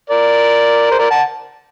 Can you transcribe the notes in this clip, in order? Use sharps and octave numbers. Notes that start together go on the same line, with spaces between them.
A#4 D5
C5
A#4 D5
F#5 A5